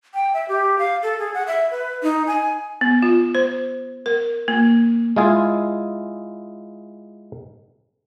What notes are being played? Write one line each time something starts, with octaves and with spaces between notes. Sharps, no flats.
G5
E5
G4
F5
A4
G#4
F#5
E5
B4
D#4
G#5
B3
F4
C5
A#4
A#3
G#3 E4 F4 G#4 G#5